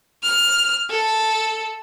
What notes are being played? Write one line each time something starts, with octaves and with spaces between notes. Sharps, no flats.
F6
A4